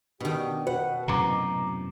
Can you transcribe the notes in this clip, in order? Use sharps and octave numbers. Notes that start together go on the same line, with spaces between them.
B2 D#3 D4 G4
B2 B4 F#5
F#2 A2 C3 A#5 D6